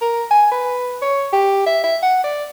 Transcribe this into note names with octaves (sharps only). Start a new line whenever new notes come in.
A#4
G#5
B4
C#5
G4
E5
E5
F#5
D5